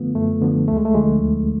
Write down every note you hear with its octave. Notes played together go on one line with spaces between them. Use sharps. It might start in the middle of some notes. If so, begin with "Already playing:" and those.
Already playing: F#2 D3 F3 A3 B3 F4
F#2 A3
D3 F3 B3
D2 A3
G#3
A3
D3 F3 G#3
D2